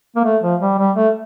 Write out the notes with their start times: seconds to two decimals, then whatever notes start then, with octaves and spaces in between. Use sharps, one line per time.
0.16 A#3
0.25 A3
0.43 F3
0.61 G3
0.78 G3
0.96 A3